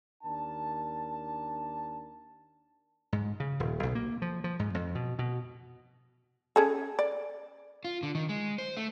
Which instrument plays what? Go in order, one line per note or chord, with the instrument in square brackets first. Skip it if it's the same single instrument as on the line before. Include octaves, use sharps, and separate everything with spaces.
[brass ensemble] D#2 D4 A#4 A5
[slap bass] G#2
C#3
D#1
B1
A#3
F3
F3
G#2
F2
B2
B2
[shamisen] C#4 G#4 A4
D5
[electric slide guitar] F4
D3
D#3
G#3
C5
A3